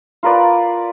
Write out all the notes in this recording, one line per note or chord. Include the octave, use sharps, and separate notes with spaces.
F4 A#4 B4 D5